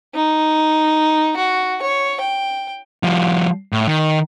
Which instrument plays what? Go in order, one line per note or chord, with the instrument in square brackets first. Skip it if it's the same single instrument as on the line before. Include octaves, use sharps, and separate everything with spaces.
[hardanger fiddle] D#4
F#4
C#5
G5
[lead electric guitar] F3 G3
A2
D#3